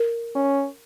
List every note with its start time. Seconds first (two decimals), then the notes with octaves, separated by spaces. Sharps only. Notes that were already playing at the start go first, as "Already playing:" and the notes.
Already playing: A#4
0.35 C#4